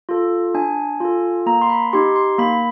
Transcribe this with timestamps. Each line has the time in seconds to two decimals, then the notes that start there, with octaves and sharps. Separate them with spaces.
0.09 F4 A4
0.54 D4 G#5
1.00 F4 A4
1.46 A#3 A#5
1.61 C6
1.70 B5
1.93 D#4 G4 C6
2.16 C6
2.38 A#3 B5